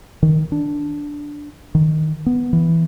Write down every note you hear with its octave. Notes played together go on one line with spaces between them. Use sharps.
D#3
D4
D#3
B3
E3